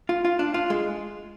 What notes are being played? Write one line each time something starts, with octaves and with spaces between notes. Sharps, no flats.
F4
F4
D4
F4
G#3